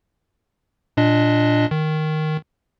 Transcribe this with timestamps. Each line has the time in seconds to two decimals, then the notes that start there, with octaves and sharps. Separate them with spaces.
0.97 A#2 D4 D#5
1.71 D#3